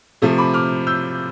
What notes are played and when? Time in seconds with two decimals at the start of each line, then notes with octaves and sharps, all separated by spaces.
0.22 C3 F3 A3
0.38 B5 D6
0.54 D6 F6
0.87 E6 G6